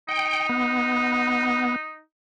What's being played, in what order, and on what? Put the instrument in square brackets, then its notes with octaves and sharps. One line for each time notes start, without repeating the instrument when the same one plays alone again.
[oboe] D#4 [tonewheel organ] G5
[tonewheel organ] B3